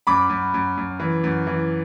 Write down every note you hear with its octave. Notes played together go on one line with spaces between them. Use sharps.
F#2 B5 D6
F#2
F#2
F#2
E3
F#2
E3